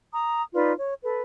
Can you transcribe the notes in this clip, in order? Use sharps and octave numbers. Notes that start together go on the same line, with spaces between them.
A#5 D#6
D#4 F4 B4 D5
C#5
A4 B4